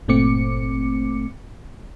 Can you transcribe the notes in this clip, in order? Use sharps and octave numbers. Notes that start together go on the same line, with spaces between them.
G1 A#2 A3 C4 D6 C#7